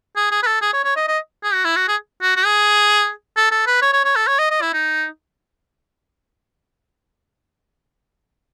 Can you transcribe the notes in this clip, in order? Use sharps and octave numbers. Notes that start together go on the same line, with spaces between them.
G#4
G#4
B4
A4
G#4
C#5
C#5
D#5
D#5
G#4
F#4
E4
F#4
G#4
F#4
F#4
G#4
A4
A4
B4
C#5
C#5
C#5
A4
C#5
D#5
D#5
E4
D#4